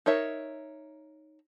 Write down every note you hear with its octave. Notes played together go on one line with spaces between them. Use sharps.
D#4 A#4 C#5 E5